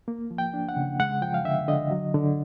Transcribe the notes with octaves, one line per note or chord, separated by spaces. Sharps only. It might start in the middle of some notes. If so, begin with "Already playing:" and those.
A#3
F3
G5
D4
F#5
C#3
G#3 F#5
F3 G5
F5
D3 E5
D3 D#5
F#3
D3